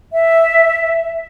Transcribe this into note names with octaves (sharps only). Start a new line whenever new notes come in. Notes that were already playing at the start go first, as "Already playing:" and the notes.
E5